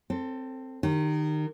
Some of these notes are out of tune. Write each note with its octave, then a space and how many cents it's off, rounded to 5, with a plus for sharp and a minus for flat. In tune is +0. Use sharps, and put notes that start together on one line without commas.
C4 +0 A4 +15
D#3 -20 G4 +0